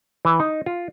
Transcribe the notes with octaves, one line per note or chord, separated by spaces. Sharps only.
E3
D#4
F4